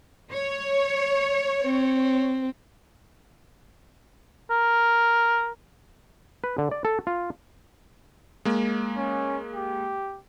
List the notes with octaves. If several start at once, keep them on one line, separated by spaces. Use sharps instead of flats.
C#5
C4
A#4
B4
D3
D5
A4
F4
G#3 A#3
C#4
G4